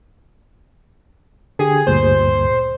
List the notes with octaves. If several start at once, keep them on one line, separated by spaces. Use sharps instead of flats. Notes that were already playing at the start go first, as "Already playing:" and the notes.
D3 G4 G#4
D2 G2 A#2 C5